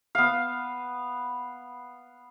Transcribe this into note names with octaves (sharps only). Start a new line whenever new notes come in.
B3 F5